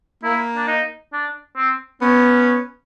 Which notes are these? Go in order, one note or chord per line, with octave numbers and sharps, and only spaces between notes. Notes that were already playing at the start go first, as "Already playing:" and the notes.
A#3 E4
D4
D#4
D4
C4
B3 C#4